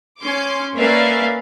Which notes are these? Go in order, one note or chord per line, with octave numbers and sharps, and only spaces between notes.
C#4 C6 D6
A#3 C#4 B4 D5 E5 F5